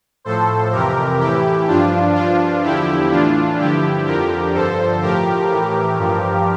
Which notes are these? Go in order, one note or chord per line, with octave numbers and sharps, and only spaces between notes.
A2 F3 A4 C5
F2 C3 E3 G4 A#4
A2 E3 E4 G4
G2 F3 D4 F4
G2 F3 D4 F4
E2 D3 F3 E4 G4
A2 E3 D4 F4
G2 D3 F3 E4 G4
F2 D3 F3 G4 A#4
G2 D3 F3 A4 C5
A2 F3 G4 A#4
A2 E3
G2 F3